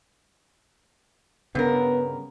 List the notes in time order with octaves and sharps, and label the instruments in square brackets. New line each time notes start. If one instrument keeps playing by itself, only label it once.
[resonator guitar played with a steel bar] G2 A#4 [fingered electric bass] C#3 [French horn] B3